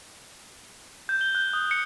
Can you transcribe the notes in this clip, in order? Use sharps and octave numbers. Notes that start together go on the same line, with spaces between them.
G6
G7
F#6
D#6
C#7